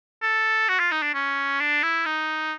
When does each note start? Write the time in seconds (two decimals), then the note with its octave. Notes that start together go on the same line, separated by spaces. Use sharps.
0.22 A4
0.69 F#4
0.80 F4
0.92 D#4
1.03 D4
1.14 C#4
1.60 D4
1.83 E4
2.06 D#4